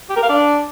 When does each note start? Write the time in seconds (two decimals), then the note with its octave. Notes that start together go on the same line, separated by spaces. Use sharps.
0.10 G4
0.16 A#4
0.23 F5
0.29 D4